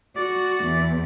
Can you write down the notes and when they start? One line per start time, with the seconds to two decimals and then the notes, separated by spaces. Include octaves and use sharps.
0.17 F#4 D5
0.64 E2